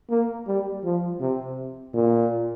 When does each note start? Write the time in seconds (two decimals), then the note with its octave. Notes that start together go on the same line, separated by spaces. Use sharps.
0.10 A#3
0.47 G3
0.84 F3
1.21 C3
1.94 A#2